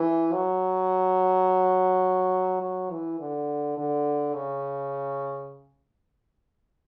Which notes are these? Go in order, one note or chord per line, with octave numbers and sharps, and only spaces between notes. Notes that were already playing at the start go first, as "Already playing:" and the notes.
Already playing: E3
F#3
F#3
E3
D3
D3
C#3